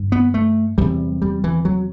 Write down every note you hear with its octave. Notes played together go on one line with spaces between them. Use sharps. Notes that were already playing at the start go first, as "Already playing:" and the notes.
Already playing: G2 D3
B3
A3
E2 C3 G3
G3
E3
F#3